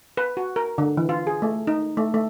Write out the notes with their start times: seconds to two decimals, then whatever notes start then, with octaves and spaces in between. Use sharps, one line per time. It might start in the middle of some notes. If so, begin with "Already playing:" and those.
0.17 B4
0.37 F#4
0.56 A#4
0.78 D3
0.97 E3
1.09 F4
1.27 G#4
1.42 A3
1.67 D#4
1.97 A3
2.14 A3